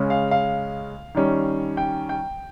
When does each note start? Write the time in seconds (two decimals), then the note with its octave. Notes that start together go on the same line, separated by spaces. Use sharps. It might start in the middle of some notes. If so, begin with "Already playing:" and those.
Already playing: C#3 G#3 C#4
0.10 F5
0.31 F5
1.15 D#3 G3 C#4
1.77 G5
2.09 G5